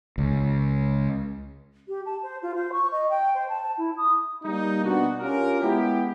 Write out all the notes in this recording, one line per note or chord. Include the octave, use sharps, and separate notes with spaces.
C#2
G4
A5
C5
F4
C5
C#6
D#5
G5
C5
A5
E4
D#6
G3 A#3 D#4
B2 B3 D4 F#4
C#4 F4 G4 A#4
G#3 B3 E4 G4